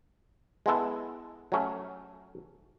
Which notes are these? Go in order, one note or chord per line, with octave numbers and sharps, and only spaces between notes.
G#3 B3 E4 A4
F#3 A3 C#4